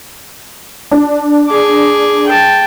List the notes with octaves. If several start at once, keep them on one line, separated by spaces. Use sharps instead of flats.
D4
G#4 D6
G5 A5